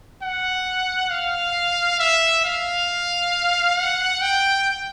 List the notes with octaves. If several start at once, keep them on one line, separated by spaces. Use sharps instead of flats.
F#5
F5
E5
F5
F#5
G5